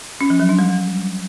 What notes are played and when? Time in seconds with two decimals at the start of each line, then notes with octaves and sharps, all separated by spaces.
0.21 C#4
0.30 F3
0.40 F#3
0.49 D4
0.59 G3